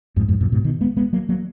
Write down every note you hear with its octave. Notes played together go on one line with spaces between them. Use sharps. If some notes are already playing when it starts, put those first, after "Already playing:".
F2 G#2
F2 G#2
F#2 A#2
G#2 B2
B2 D#3
G#3 B3
G#3 B3
F#3 A#3
F#3 A#3